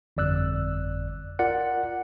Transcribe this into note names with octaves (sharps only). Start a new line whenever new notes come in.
G1 F2 D5 E6 F#6
F4 A#4 D5 F#5